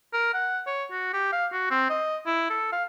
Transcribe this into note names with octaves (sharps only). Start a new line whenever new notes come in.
A#4
F#5
C#5
F#4
G4
F5
F#4
C4
D#5
E4
A4
F5